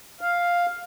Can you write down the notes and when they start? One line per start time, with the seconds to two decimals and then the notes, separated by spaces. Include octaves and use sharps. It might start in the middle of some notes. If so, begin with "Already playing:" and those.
0.21 F5